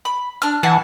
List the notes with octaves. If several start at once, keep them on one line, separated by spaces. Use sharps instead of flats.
B5
D4 F6
E3 F#5 G#5 A5